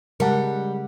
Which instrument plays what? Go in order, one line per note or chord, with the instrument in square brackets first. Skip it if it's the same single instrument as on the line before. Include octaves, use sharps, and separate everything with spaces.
[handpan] C#3 G#3 F#5 [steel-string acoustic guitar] G3 [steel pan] A#4 A5